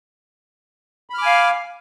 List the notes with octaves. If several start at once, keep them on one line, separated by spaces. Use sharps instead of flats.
F5 G#5 B5 D6 F6